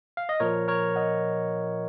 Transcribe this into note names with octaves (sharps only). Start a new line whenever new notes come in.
F5
D#5
A#2 F3 A#4 C#5
A#4 C#5
D#5 F#5